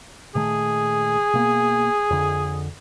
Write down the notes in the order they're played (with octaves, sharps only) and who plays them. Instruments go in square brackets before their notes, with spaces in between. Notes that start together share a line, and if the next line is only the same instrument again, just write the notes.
[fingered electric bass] A#2 D#3 A3 [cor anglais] G#4
[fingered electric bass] B2 A#3 B3
F2 D3